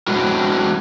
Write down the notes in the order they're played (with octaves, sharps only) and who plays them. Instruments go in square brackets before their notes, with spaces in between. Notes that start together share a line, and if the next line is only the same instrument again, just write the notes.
[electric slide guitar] F#3 G#3 C4 D4 E4 F#4